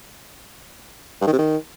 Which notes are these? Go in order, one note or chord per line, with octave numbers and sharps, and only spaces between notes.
G2
D#3
C3
D#3